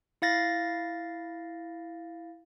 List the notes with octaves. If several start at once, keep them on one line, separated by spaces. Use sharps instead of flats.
E4 F5 A6 A#6